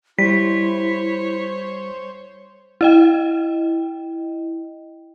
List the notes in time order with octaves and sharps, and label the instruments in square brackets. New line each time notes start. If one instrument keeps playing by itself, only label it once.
[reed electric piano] G3 [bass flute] E4 [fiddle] C5 C#5 [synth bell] B6
[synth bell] E4 D#5 G5